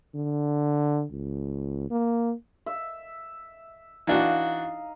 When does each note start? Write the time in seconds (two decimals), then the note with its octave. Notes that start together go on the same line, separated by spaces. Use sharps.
0.15 D3
1.12 C#2
1.91 A#3
2.66 E5
4.07 E3 D4 D#4 F#4 F5